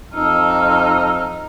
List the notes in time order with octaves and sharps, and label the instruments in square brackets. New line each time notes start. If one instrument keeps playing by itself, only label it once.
[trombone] F2 [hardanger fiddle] D#4 [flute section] A5 E6 F6